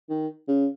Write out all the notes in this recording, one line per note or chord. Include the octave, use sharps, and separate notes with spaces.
D#3
C#3